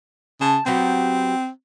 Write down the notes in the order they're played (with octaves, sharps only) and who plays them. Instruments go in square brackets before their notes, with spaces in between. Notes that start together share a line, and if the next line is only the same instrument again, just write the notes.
[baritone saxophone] C#3 [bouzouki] A5
[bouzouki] F#3 B3 G4 [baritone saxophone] C4